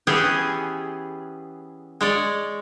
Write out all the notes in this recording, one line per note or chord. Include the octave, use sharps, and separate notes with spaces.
E3 B3 C#4 G4 G#4
G#3 C#5 D5